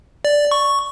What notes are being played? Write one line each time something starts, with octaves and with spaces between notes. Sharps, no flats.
D5
C#6